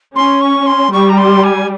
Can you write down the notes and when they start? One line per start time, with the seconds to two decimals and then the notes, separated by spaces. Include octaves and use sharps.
0.16 C#4 C6
0.41 C#6
0.66 C6
0.92 G3 C#6
1.09 A#5
1.18 C6
1.43 G#5